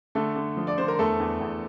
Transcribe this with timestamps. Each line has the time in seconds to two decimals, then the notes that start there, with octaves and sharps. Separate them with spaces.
0.15 D3 A3 A4
0.36 D3
0.57 F3
0.67 D5
0.78 D3 C5
0.88 A#4
0.99 E2 A3 A4
1.19 E2
1.41 E2